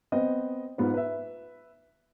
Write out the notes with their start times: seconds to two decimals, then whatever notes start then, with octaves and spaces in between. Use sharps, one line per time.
0.12 B3 C4 D#5
0.78 G#2 B3 F4 B4
0.94 B4 E5